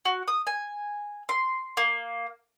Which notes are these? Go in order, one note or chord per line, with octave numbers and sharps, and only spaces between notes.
F#4
D#6
G#5
C6
A#3